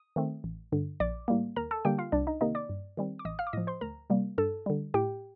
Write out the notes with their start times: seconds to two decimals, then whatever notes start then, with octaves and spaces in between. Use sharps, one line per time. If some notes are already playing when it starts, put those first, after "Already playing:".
Already playing: D#6
0.16 D#3 A3 C4
0.44 A1
0.72 G2 D3
1.00 A#1 D5 D6
1.28 A2 G3 A#3
1.56 D#2 A#4 A#5
1.71 A4 A5
1.85 D3 G3 A#3 G4 G5
1.98 F4 F5
2.12 C2 D4 D5
2.27 D#4 D#5
2.41 C3 D#3 A#3 D#4 D#5
2.55 D5 D6
2.69 G2
2.97 D#3 G3 C4
3.19 D6
3.25 A1 D#5 D#6
3.39 F5 F6
3.47 D6
3.53 A2 F3 D#5 D#6
3.67 C5 C6
3.81 D2 A#4 A#5
4.10 C3 G3 A#3
4.38 G2 A4 A5
4.66 D3 G3
4.94 A2 G4 G5